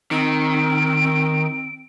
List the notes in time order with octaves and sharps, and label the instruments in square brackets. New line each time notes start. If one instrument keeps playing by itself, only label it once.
[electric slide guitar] D#3 [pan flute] C4 [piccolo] D7